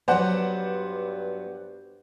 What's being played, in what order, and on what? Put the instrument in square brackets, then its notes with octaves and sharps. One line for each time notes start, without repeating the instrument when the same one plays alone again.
[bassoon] G2 [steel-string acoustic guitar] F#3 B3 [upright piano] C5 D5 F#5